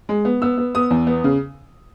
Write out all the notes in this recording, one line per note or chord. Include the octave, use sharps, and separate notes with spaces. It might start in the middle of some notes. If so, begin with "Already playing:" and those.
G#3
B3
B3 E6
B3
B3 D#6
E2
B3
C#3